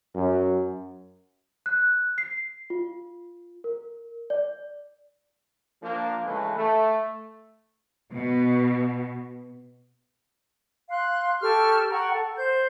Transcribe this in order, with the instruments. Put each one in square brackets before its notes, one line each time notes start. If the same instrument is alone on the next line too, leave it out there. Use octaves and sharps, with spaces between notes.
[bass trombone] F#2
[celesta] F#6
C7
F4
A#4
D5
[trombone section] F3 A#3 D4
C#3 E3 G#3 A3 C#4 B4
A3
[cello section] B2
[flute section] F5 C6 F#6
G4 A4 C#6 F6
F#5 G5 A#5 C#6
A4
C5 G6